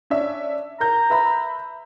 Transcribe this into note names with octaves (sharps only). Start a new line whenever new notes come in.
C#4 D4 E5
A#4 A#5 G6
B4 E5 B5